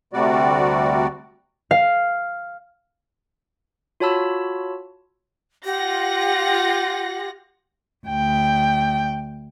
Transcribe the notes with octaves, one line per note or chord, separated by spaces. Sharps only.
D2 C3 G3 F#4 D5
F5
F4 F#4 C#5 A5 B5 E6
F4 G4 F#5 A#6
D2 G5